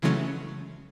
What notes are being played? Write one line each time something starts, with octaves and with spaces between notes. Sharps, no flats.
C#3 E3 F#3 G#3 A3 C#4